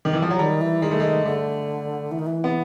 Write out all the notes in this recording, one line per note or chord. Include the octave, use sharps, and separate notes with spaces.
D#3
E3
F3
F#3
D#3 G3
E3
D#3 G#3
A3
G#3
D3 A3
E3
D#3
E3
B3